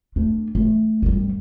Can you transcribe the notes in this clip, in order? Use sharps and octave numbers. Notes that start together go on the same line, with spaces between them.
A3 D4
A3
F#2 G3